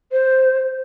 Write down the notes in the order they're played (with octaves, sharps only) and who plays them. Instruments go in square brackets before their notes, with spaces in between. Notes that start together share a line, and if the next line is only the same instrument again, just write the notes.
[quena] C5